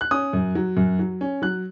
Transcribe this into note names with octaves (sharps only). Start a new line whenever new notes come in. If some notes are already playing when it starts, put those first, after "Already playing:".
F#6
C#4 D#6
F#2
F#3
F#2
F#3
C#4
F#3 F#6